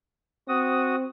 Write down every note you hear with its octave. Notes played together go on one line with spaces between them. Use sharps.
C4 F#4 D#6